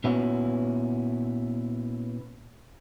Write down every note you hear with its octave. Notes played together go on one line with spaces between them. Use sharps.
A#2 B3 C#4 E4 F#4